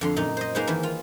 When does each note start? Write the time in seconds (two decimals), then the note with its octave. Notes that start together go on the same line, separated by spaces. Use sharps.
0.01 F2 D3 C6
0.16 F#2 A#2 D#4
0.37 C5 D#5
0.55 A#3 D#4 G#4 B4 C5
0.67 D#3 E3 E4
0.83 F4